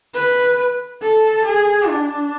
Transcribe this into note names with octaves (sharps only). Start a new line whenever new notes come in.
B4
A4
G#4
D4